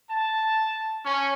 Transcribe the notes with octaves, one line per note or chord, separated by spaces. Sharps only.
A5
C#4